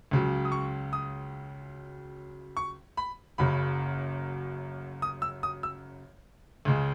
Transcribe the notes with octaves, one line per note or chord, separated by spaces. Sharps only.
C#2 C#3 F#3
D#6
C#6
D#6
C#6
B5
F#1 F#2 C#3 B5
D#6
E6
D#6
E6
C#2 C#3 G#3